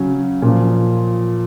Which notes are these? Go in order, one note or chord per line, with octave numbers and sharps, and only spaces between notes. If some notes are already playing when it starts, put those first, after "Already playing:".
Already playing: C#3 F#3 C#4
A#2 F3